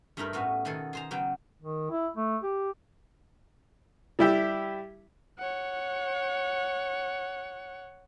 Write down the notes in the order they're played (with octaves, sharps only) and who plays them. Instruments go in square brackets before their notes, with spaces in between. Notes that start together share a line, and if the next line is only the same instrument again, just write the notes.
[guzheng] G2 A3 D#4 E4 A#4
A2 B3 C#4 F#4
B2 D#3 G#4 A4
G#4 C5 A#5
C#3 F#3 B3 G5
[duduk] D#3
E4
A3
G4
[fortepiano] G3 E4 G4 E5
[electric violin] C#5 F#5